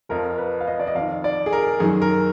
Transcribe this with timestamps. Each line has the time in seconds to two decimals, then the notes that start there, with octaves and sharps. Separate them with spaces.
0.09 F2 F3 A#4
0.38 B4
0.61 F5
0.67 D#5
0.80 D5
0.87 D#5
0.95 F2 D#3 F5
1.24 D5
1.46 G#4
1.53 A#4
1.80 F#2 D#3 G#4
2.02 A#4